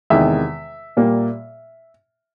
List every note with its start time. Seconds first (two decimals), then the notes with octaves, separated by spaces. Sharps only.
0.10 E2 C3 D#3 G#3 E5
0.97 A#2 G3 A#3